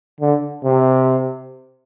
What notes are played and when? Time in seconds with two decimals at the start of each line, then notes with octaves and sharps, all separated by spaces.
0.21 D3
0.64 C3